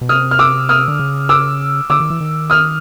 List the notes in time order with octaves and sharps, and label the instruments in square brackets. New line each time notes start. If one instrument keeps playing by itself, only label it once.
[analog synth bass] B2
[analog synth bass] C3 [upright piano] D#6 F6
[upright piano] F6
D6 E6
D#6 F6
[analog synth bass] D3
C#3
[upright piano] D6 E6
[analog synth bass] D3 [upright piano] D6 E6
[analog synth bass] D#3
E3
D#3
[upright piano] D#6 F6